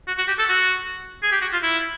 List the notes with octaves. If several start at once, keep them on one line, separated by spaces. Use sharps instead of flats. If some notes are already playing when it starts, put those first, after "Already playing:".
F#4
F#4
G4
A4
F#4
G#4
G4
F#4
F4
E4